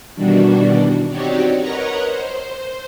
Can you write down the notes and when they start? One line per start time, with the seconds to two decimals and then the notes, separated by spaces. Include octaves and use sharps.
0.15 B2 D#3 E3 G3 D4 F#4
1.09 C4 D#4 F#4 G4 C#5 D5
1.60 A#4 B4 C#5 D#5 F#5 A#5
2.04 C5